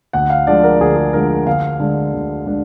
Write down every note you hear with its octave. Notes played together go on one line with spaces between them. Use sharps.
D2 F#5
F5
D3 F3 G#3 D5
A#4
D2 G#4
G#4
D3 F3 G#3 A#4
D2 F5
D3 G#3 D4
D2
D3 G#3 D4